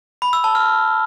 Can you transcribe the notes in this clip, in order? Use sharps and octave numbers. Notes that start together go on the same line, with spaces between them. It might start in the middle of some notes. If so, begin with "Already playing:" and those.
B5
E6
A5
F6